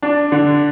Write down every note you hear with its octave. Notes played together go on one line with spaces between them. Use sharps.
D4
D3